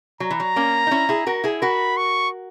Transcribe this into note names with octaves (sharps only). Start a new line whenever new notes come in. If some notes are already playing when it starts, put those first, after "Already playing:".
F#3 A#5
E3
F#3
A#3 C#4
D#4
C#4 E4
E4 G#4
F#4 A#4
E4 G#4
F#4 A#4 B5
C#6